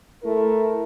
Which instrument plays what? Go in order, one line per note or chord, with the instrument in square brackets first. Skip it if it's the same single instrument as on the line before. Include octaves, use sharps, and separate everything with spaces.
[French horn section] A3 E4 A#4